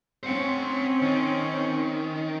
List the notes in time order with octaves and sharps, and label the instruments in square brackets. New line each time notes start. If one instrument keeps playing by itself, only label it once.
[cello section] C4 C#4 [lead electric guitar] C5 F#5
[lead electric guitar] D#3